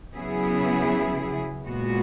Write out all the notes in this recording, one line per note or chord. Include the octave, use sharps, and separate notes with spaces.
C#3 F#3 B3 E4 G#4
A#2 G#3 B3 F#4